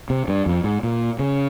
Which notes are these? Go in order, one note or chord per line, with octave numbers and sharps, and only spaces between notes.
C3
G2
F2
G#2
A#2
C#3